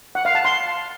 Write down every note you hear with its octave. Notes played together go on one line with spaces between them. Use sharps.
F#5
F5
A5
C6